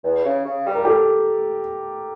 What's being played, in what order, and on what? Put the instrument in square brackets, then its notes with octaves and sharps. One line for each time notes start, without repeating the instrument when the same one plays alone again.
[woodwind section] E2
C#3
C#3
G3
[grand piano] A#4
G4 A4